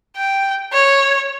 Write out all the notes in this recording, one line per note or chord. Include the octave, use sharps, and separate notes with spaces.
G5
C#5